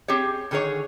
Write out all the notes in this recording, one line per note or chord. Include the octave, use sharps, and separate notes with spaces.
C4 G4 G#4 C#5
D3 D#3 G#4 A#4 C#5